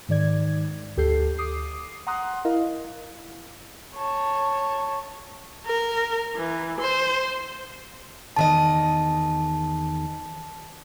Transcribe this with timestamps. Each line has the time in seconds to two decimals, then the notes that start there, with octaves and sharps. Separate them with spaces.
0.09 G#2 D#3 D5 G#6
0.97 D2 G4 A4 G6 C7
1.38 D6 D#6 C7
2.07 F#5 A#5 C6 D#6 F#6
2.45 E4 A#4 D#5 F5
3.95 C#5 A5
5.67 A#4
6.36 E3
6.80 C5
8.36 E2 D#3 D#5 A5